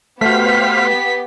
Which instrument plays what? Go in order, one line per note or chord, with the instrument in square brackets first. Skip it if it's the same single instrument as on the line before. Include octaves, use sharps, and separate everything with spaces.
[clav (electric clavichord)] A3 F#4 [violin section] B3 G4 [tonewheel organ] C5 F5 [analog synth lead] B6